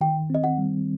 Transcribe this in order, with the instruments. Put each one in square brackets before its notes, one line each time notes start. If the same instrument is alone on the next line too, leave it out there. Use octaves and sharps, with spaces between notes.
[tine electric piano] D#3 [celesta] G5
[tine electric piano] C4 [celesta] D#5
[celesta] F#5
[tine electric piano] G3